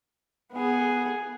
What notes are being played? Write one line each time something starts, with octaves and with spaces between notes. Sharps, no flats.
B3 G#4